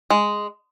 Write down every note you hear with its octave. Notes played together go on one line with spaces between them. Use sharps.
G#3